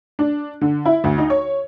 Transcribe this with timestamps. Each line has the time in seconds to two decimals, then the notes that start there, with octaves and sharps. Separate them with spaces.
0.19 D4
0.61 D3
0.85 E4
1.04 D2
1.18 D#4
1.30 C#5